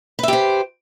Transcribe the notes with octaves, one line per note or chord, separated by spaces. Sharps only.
G4 B4 C5 E5